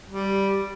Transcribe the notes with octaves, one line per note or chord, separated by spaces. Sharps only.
G3